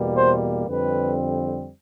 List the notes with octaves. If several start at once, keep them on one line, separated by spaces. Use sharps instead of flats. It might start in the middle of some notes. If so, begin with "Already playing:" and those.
Already playing: E2 B2 G3 A#3
C5
F2 D3 G3 C4 B4